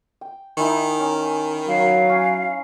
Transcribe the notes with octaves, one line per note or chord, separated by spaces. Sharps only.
G5
D#3 D#4 E4 G#5
C#4
F#3 F5
C#4